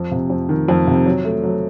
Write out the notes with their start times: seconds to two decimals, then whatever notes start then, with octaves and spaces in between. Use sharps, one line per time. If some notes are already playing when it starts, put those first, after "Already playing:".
Already playing: F2
0.11 C3
0.30 F2
0.49 D#3
0.68 F2
0.87 C3
1.06 F#3
1.25 A3
1.43 F#3